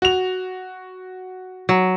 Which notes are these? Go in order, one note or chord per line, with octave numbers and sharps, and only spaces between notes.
F#4 F7
F#3